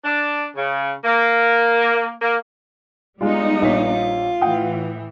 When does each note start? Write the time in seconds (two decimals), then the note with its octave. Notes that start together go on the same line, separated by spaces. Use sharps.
0.04 D4
0.56 C#3
1.04 A#3
2.22 A#3
3.21 G3 G#3 B3 D4 D#4 F4
3.62 A#1 F4 C#5 B6
4.41 A2 E3 F#5 G5 D#6